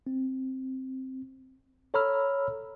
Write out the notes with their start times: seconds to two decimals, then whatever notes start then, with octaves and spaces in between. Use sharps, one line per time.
0.07 C4
1.94 A4 C#5 A#5 B5 E6 F6